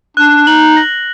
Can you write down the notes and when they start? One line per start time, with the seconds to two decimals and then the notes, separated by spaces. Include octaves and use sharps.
0.17 D4 F#6
0.47 D#4 F#7
0.77 A#6